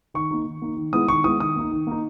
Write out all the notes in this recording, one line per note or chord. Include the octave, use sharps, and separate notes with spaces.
D#3 C#6
A#3 D#4
D#3
A#3 D#4
D#3
G#3 B3 E4 D#6
D#3 C#6
G#3 B3 E4 D#6
D#3 D#6
A#3 D#4
D#3
A#3 D#4